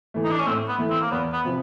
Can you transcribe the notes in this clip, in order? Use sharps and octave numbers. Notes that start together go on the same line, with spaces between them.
E3 A3
D#4
D4
C#4
A2 C4
B3
E3 A3
C4
A#3
E2 B3
B3
C3 F3